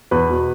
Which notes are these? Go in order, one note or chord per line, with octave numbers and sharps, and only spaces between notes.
E2 B4
B2